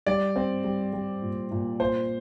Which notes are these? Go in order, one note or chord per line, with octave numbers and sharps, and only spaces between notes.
G3 D5
C4
G3
G3
A#2
A#2
A#2 C5